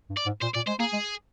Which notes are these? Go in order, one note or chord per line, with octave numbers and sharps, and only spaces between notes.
G2
D5
G#2
A#2 C5
A#2 D5
G#3 C5
A#3 G#4
G#3